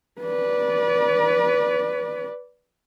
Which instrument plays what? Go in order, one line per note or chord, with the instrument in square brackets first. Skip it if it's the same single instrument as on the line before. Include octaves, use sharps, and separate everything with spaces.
[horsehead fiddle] B4 D5